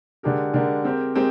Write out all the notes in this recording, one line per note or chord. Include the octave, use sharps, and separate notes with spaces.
D3 G#3 D4 G4 A#4
D3 G#3 D4 G4 A#4
G#3 C4 G4 A#4
G#3 C4 G4 A#4